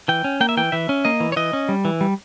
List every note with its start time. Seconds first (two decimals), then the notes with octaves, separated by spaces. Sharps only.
0.08 E3 G5
0.24 C#4
0.40 A#3 G5
0.49 E5
0.57 E3 G5
0.72 E3 E5
0.89 C#4
1.05 A#3 D#5
1.20 E3
1.32 C#5
1.36 E3 D#5
1.53 C#4
1.69 G3
1.85 E3
2.01 G3